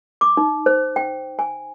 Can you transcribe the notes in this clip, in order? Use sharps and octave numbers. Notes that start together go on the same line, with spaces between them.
D6
D#4
C5
G5
G#5